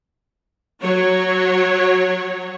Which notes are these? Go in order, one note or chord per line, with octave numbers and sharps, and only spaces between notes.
F#3 C#5